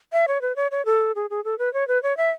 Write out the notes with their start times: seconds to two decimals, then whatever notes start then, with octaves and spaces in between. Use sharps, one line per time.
0.13 E5
0.28 C#5
0.42 B4
0.56 C#5
0.71 C#5
0.85 A4
1.15 G#4
1.30 G#4
1.44 A4
1.59 B4
1.74 C#5
1.88 B4
2.03 C#5
2.17 E5